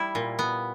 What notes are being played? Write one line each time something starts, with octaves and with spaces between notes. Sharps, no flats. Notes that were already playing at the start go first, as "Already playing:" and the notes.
Already playing: G3 E4
A#2
B3